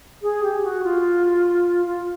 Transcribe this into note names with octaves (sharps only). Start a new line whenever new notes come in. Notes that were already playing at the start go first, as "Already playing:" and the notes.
G#4
G4
F#4
F4
F4